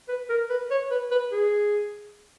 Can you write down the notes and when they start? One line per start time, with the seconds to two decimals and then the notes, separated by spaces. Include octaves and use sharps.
0.09 B4
0.30 A#4
0.50 B4
0.71 C#5
0.91 B4
1.11 B4
1.32 G#4